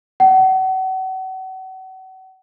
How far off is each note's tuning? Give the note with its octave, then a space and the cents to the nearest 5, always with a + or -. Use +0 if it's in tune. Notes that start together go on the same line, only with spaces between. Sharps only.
F#5 +35